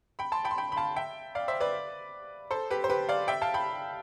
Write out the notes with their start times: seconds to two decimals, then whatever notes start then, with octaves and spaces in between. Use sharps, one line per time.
0.19 G5 B5
0.32 A5 C6
0.45 G5 B5
0.51 C6
0.58 G5 B5
0.72 B5
0.77 F5 A5
0.96 E5 G5
1.35 D5 F5
1.48 C5 E5
1.60 B4 D5
2.51 A4 C5
2.71 G4 B4
2.84 C5
2.90 G4 B4
3.09 D5 F5
3.28 E5 G5
3.42 F5 A5
3.54 G5 B5